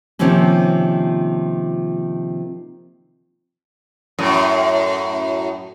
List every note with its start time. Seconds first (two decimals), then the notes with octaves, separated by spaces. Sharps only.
0.19 C3 D#3 F3 A#3 C4 C#4
4.19 F#2 A2